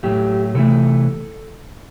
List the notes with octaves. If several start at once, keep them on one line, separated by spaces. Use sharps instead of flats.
A2 F#3 A3 G4
C3 E3 A3 A4